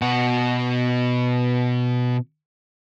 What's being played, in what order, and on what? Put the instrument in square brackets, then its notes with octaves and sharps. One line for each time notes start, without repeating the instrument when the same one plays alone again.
[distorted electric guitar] B2 F#5